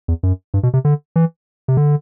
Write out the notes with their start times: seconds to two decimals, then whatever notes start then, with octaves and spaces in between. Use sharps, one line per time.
0.08 E2
0.23 F#2
0.54 G2
0.63 B2
0.74 C3
0.85 D3
1.16 E3
1.68 C3
1.77 D3